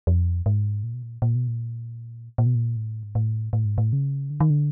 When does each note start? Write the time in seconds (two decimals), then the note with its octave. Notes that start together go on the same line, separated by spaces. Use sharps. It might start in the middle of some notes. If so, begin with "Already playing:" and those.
0.07 F2
0.46 G#2
0.84 A#2
0.94 B2
1.03 A#2
1.22 A#2
1.35 B2
1.48 A#2
2.38 A#2
2.46 B2
2.55 A#2
2.76 A2
3.03 G#2
3.15 A2
3.53 A2
3.65 G#2
3.78 A2
3.93 C#3
4.30 D3
4.40 D#3
4.50 D3